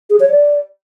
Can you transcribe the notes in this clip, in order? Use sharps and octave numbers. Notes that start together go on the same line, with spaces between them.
G#4
C#5
D5